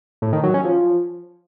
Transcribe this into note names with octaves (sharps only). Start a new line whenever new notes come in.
A2
D#3
F#3
C#4
F3